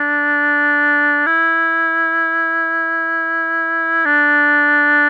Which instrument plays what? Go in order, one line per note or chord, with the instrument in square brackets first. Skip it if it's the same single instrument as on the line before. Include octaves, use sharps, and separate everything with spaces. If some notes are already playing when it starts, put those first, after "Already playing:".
Already playing: [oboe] D4
E4
D4